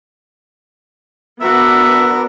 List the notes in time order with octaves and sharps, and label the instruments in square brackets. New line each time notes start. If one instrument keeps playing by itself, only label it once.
[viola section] B3 D4 [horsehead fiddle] F#4 [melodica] A#4 [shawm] E5